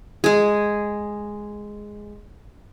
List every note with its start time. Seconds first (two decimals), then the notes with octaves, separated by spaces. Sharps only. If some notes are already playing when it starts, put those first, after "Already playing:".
0.24 G#3 G#4